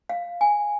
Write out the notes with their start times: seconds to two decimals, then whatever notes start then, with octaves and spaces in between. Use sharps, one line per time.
0.09 F5
0.41 G#5